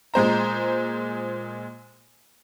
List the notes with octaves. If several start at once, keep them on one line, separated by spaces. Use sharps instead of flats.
A#2 G#3 C5 A#5